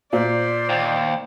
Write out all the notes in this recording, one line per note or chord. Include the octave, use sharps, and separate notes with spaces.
A#2 C5 D5
D#2